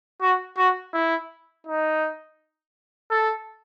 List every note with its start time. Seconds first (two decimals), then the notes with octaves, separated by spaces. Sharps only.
0.21 F#4
0.57 F#4
0.94 E4
1.66 D#4
3.11 A4